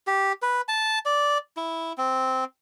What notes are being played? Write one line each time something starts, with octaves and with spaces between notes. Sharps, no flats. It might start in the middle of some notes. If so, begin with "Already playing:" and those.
G4
B4
A5
D5
E4
C4